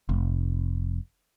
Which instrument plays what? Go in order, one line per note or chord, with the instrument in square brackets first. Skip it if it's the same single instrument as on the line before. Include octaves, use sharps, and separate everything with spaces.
[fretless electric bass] F1